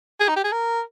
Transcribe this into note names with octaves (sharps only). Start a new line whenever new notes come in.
G#4
D#4
G4
G#4
A#4